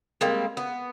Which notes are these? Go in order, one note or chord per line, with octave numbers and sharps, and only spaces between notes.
G3 G#3 A#3 C4
B3